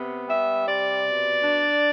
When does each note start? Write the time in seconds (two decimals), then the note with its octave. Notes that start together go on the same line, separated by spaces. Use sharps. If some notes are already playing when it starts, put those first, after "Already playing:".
Already playing: C3 B3
0.28 G3 E5
0.66 C3 D5
1.05 B2
1.43 D4